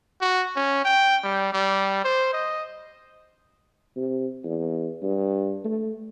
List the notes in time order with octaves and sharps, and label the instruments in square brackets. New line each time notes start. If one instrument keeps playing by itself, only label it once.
[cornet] F#4
C#4
G5
G3
G3
C5
D#5
[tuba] C3
E2
G2
A3